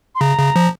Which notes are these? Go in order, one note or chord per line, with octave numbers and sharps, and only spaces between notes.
C6
C#3 A#5
C#3
F3